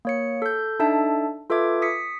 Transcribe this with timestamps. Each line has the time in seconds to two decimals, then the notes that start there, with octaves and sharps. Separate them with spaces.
0.05 A#3 C#5 C#7
0.42 A4 G6
0.79 D4 D#4 A4 E5 A5
1.50 F4 A4 B4 E5 D6 G#6
1.82 D#6 B6 C#7